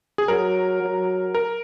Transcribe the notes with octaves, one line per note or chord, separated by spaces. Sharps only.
G#4
F#3 A#4
F#3
A#4